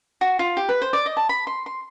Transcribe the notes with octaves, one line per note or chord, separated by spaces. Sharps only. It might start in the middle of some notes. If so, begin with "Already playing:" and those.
F#4
F4
G4
B4
C5
D5
D#5
A5
B5
C6
C6